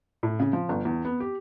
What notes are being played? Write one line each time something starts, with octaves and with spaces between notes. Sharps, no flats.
A2
C#3
F3
G1
E2
B3
G4